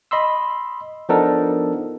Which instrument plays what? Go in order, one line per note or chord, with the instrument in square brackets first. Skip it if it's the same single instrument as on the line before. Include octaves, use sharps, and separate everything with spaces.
[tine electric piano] D#5 B5 C6 E6
F3 B3 D4 D#4 A4 A#4